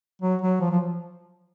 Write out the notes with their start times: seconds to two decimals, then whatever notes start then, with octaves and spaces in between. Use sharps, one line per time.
0.22 F#3
0.42 F#3
0.61 F3
0.71 F3